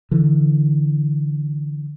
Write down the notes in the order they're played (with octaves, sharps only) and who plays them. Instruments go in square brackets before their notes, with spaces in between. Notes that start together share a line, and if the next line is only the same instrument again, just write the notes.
[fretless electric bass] D3 E3